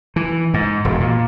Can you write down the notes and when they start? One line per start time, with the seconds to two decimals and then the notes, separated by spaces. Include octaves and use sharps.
0.16 E3
0.54 G#2
0.85 E1
1.00 A#2